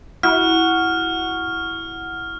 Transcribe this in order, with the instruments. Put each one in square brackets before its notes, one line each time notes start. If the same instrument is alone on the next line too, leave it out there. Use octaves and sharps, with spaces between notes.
[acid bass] E4 [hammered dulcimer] F#4 [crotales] F6